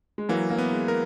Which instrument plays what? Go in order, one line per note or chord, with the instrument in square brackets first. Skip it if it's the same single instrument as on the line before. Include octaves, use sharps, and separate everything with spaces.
[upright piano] G#3
[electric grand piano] E3 [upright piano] F#3 A#3
[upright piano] F#3 A#3
[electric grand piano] B3
[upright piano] G#3
[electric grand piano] A#4